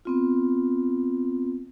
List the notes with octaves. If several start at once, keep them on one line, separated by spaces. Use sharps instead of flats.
B3 C4 F4